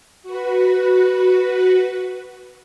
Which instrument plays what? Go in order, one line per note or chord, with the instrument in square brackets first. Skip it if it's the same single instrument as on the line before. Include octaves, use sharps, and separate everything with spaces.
[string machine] F#4 B4